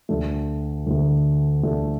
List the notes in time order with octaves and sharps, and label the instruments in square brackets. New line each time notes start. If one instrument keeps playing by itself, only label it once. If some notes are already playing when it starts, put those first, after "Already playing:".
[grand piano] D2 D3 A3
D2 D3 A3
D2 D3 A3